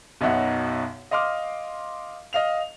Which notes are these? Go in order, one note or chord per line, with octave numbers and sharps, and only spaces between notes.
B1 F#2 B2 D#4 E5 F#5
D#5 F5 C6 D6 F6
D#5 F5 F7